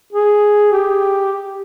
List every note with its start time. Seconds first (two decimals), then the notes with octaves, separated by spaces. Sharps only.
0.13 G#4
0.72 G4